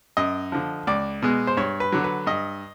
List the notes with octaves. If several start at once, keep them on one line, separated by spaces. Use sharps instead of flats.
F#2 D#5
D3 F3
C#2 D5
B2 G#3
C5
G2 C#5
B4
D3 F#3
B4
G2 D#5